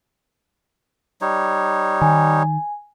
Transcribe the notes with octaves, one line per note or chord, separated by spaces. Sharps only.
G3 D#4 C#5
D#3 G#5